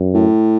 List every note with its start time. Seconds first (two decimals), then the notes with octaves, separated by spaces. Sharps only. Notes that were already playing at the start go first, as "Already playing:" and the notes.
Already playing: F#2
0.14 A2